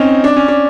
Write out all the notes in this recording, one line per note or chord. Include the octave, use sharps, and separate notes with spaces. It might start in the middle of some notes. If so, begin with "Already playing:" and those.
Already playing: C4 C#4 D#4
D4
C#4
D4